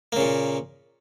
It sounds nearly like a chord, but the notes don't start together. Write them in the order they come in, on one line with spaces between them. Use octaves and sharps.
A#3 C#3 A#2